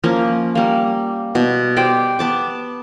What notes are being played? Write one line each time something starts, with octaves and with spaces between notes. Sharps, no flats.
F3 A#3 C#4
G3 A#3
B2
G4 C5 D5 G5
B3 A5 D6